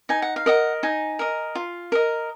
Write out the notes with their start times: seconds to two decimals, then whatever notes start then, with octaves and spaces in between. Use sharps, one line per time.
0.09 D#4 G#5
0.22 F#5
0.36 F5
0.46 A#4 D#5 F#5
0.83 D#4 G#5
1.19 A#4 D#5
1.55 F4
1.92 A#4 D#5